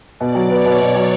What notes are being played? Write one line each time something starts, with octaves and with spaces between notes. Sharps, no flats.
B2 D5
F#3
B3 C#5
B2
B2
F#3